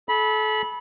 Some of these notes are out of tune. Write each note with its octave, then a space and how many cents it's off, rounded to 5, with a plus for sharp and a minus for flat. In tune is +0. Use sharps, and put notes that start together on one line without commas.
A4 -35 B5 -15